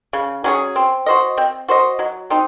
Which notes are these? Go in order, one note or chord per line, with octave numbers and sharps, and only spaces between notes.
C#3
F#3 C#4 G#4
C4
F#4 C5 D#5
C4
F#4 C5 D#5
F#3
C4 D#4